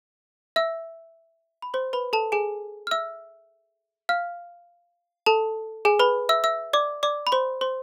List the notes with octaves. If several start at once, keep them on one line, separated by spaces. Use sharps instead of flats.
E5 E6
B5
C5 C6
B4 B5
A4 A5
G#4 G#5
F6
E5 E6
F5 F6
A4 A5
G#4 G#5
B4 B5
E5 E6
E5 E6
D5 D6
D5 D6
B5
C5 C6
C5 C6